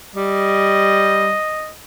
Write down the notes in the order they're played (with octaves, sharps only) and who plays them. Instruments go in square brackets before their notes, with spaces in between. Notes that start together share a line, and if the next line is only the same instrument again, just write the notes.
[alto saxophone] G3 [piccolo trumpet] D#5